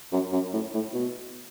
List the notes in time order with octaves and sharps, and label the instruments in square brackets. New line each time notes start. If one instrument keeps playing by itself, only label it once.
[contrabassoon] F#2
F#2
A2
A2
B2